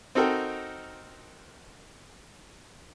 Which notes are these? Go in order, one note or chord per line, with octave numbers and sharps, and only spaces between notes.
C4 D#4 F#4 A4 A#4 G5